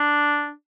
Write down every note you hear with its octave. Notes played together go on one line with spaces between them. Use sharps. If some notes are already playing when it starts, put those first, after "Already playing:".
Already playing: D4